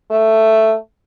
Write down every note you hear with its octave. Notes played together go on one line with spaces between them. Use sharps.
A3